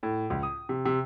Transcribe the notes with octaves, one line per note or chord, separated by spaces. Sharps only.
A2
C#2
D#6
C3
C3